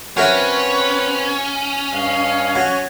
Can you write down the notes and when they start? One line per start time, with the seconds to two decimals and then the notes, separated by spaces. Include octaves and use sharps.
0.17 F#3 C4 C#4 A#4 B4 E5
1.92 G2 D#5 F5
2.56 F#3